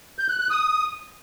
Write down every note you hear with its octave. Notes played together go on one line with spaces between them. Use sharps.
G6
F#6
F#6
D#6